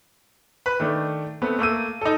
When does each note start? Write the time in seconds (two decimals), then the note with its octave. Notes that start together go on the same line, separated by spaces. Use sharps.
0.66 B4 B5
0.80 D#3 A3 D4
1.42 A3 B3 C4
1.59 A3 A#3 E6 D#7
2.01 D#4 A4